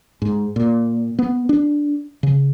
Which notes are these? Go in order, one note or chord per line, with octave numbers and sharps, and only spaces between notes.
G#2
A#2
B3
D4
C#3